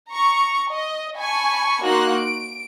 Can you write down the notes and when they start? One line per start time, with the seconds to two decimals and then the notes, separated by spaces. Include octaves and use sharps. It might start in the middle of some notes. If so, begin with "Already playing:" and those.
0.11 A#5 C#6
0.68 D#5
1.17 G#5 A5 B5 C#6
1.84 A#3 D#4 F#4 C6 F#6 A#6
2.17 D7